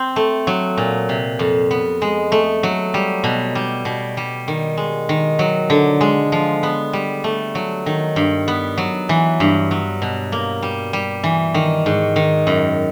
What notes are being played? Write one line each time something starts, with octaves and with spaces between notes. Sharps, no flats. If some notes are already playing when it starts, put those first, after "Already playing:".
Already playing: C4
A3
F#3
A#2
C3
F2
B3
G#3
A3
F#3
G3
B2
G3
B2
G3
D#3
G#3
D#3
F#3
D3
G#3
F3
B3
G3
A3
F#3
D#3
G2
B3
F#3
E3
G2
F#3
B2
A#3
G3
G3
E3
D#3
G#2
D#3
F#2